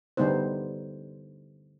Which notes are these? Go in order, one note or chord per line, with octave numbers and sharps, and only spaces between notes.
D3 G3 B3 D#4 C5